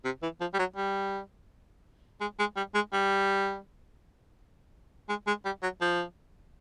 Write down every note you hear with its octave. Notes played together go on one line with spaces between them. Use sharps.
C3
E3
F3
G3
F#3
G3
G#3
G#3
G3
G#3
G3
G#3
G#3
G3
F#3
F3